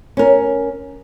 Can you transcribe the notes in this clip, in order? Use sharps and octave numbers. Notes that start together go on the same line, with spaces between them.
C#4 A#4